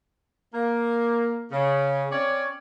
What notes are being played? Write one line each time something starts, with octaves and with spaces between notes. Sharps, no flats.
A#3
C#3
C4 C#4 C#5 D5